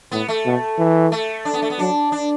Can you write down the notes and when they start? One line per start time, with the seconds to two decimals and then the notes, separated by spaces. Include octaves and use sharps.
0.11 A2 B3
0.28 A3
0.45 B2
0.78 E3
1.12 A3
1.45 D4
1.53 B3
1.62 A3
1.70 B3
1.78 F#3 D4
2.12 D4